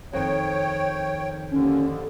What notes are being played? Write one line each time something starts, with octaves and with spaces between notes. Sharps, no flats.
F2 D#3 C#5 G5
D#2 D3 C#4